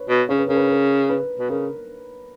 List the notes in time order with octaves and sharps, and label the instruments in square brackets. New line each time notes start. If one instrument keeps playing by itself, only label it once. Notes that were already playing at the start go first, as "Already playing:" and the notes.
Already playing: [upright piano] B4 C#5
[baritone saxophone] B2
[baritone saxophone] C#3 [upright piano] C#5
[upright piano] B4
[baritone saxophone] C#3 [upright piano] A#4
[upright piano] B4
A#4
B4
[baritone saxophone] B2
[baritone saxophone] C#3 [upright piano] A#4